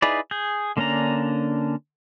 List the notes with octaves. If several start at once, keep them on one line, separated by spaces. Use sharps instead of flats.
D#4 E4 G#4 B4 D5
G#4 G6
D3 A#3 C#4 D4 A#5